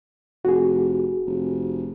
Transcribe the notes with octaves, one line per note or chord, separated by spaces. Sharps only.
F1 F#4 G#4
F1